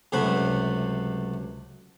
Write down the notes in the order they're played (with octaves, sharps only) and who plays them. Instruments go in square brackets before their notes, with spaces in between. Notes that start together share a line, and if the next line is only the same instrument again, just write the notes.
[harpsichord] C#2 F#2 C3 A3 B4 F#5